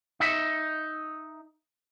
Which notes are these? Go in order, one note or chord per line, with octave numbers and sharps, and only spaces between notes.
D#4 E5